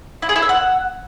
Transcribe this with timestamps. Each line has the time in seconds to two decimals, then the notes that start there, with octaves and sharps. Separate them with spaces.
0.22 E4
0.29 G#4
0.36 E4
0.42 E5
0.49 F#5